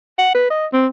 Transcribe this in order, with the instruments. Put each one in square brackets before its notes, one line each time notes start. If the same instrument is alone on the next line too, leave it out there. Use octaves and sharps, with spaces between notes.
[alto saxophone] F#5
B4
D#5
C4